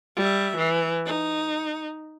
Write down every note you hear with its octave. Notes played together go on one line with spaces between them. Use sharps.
G3 E5
E3
D#4